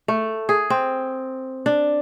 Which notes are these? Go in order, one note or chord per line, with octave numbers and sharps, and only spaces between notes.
A3
G#4
C4
D4